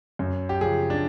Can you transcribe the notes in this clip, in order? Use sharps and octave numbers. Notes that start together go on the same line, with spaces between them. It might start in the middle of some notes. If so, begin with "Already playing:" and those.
F#2
G4
C#3 F3 G#4
D4